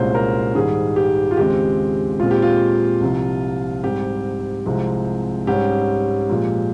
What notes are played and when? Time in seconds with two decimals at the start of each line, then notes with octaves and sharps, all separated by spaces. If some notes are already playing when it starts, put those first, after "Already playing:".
Already playing: C2 A#2 G#3 C#4 C5
0.14 A#4
0.55 G#2 D#3 G3 G#4
0.96 G4
1.31 F4
1.37 D#2 C#3 G#3 C4 G4
2.20 A#2 G#3 C4 F4
2.31 G4
2.42 F4
3.01 C2 C3 F3
3.83 G#2 G3 C4 G4
4.66 C2 C3 F3 G#3 C4
5.47 G#2 G3 C#4 G4
6.30 A#2 F3 G#3